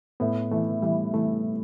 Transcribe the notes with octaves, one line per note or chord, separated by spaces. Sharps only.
A2 B3
E3 A3
E3 G3
E3 A3